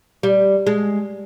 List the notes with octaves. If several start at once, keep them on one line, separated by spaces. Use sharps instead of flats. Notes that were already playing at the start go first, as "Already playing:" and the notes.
G3
G#3